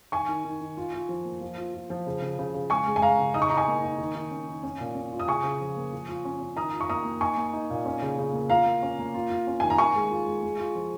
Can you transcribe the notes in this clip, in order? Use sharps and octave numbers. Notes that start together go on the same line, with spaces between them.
D#3 G#5 C#6
D#3
D#3
D#3
F4
F4
F3
A#3
F3
F4
F4
F3
C#3
C#3
C#3
C#3
G#3 G#5 C#6
G#3
G#5
G#3 F5 A#5
C#3
D#4 D#6
C#6
D#4 A#5
G#5 C#6
A#3
D#4
D#3
D#3
C#4
D#3
C#4
A#2
C#4
F4
D#6
C#3 G#5 C#6
C#3
F3
A#3
F3
F4
C#4
C#4
D#3 A#5 D#6
F4
C#6
A#3 A#5 D#6
A#3
D#4 G#5 C#6
A#3
D#4
A#2
C#4
C#3
C#3
A#3
F4 F5 A#5
A#3
C#4
A#3
F4
F4
C#4
D#3 G#5
A#5
D#3 G#5 C#6
G#3
F4
G#3
G#3
F4
F3